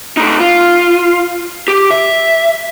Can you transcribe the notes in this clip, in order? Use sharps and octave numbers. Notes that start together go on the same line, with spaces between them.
A3 D#4
F4
G4
E5